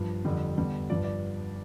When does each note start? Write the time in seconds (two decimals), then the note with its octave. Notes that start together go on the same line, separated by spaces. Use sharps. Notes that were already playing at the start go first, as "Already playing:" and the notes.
Already playing: G2 F3
0.25 F2 D3 G3
0.57 E2 D3 G3
0.90 G2 F3 D5
1.04 D5